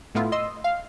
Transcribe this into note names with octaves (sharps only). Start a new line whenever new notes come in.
A2 A3 B3 E4 F4
D#5 C6 E6
F5